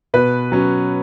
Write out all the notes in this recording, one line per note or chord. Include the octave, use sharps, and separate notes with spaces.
B2 B4
F#3 C#4